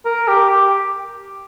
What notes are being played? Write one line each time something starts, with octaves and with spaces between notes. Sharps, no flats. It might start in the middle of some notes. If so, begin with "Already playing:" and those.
A#4
G4
G4